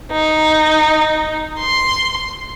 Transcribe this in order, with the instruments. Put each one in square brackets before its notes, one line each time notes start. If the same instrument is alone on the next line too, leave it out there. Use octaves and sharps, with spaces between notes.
[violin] D#4
C6